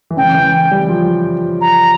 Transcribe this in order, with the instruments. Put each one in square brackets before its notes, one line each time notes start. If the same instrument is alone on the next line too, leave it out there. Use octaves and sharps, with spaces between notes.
[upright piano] E3
[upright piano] C#3 [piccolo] G5
[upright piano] E3
G3
F3
[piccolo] A#5